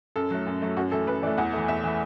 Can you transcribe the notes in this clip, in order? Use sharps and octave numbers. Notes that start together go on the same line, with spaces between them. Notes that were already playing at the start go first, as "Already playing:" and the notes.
F#2 A4
F#3 A3
F#2
F#3 A3
F#2 F#4
E3 A3 A4
F#2 B4
E3 A3 D5
E2 F#5
E3 A3
E2 E5
E3 A3